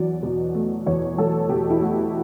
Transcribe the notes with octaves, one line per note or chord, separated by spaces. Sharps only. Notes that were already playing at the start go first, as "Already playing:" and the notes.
Already playing: E2 F#3 D5
B2
A3
E2 C#5
F#3 A4
B2 G4
E4
A3 F#4